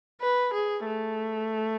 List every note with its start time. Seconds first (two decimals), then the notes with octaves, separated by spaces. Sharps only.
0.21 B4
0.53 G#4
0.86 A3